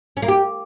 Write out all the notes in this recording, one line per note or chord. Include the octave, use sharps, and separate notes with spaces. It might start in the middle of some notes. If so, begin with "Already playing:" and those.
C#4
A#3
G4